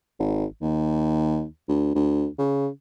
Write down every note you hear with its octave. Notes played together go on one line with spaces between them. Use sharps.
G#1
D#2
D2
D2
C#3